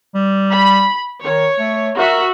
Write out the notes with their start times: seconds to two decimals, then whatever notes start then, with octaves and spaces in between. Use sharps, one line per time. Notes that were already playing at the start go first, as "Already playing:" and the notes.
0.15 G3
0.53 B5
1.24 D#3 C#5
1.59 A3
1.97 F#4 A#4 E5